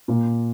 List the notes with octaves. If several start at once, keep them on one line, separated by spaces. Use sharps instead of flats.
A#2